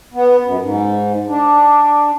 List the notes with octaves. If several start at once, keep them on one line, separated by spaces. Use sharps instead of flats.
B3
F#2
G#2
D4